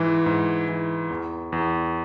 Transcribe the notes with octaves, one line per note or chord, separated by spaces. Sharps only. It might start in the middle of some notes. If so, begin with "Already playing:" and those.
Already playing: G#2 E3
G#2
E3
E2
E2